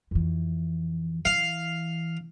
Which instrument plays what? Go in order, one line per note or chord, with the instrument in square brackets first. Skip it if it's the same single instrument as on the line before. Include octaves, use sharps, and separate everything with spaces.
[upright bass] F2 E3
[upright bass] E3 [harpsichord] F5